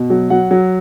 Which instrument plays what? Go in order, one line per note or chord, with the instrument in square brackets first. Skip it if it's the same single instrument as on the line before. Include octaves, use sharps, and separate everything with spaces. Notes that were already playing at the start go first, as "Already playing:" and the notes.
Already playing: [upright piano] B2
F#3
F#3 F#5
F#3